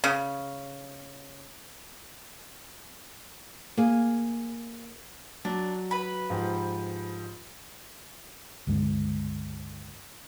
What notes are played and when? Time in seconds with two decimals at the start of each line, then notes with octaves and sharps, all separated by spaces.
0.04 C#3
3.77 A#3 G#4
5.45 F#3 D4
5.91 B4 B5
6.30 G#2 F3 G4
8.67 C#2 G2 D3 G#3